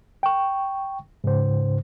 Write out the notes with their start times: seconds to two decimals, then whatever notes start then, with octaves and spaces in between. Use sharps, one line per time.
0.23 G5 C#6
1.24 G#2 C#3 C5